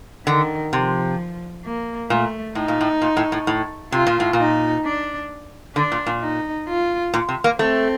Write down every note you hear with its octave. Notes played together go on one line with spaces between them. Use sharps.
D3 D#3
C3 F3
A#3
A#2 A3
A2 D#4
A#2
A2
A#2
A2
A2
A2
C3 F4
A#2
A2
A#2
D#4
D4
D3 D4
A#2
A#2
D#4
F4
A#2
C3
A#3
A3 C4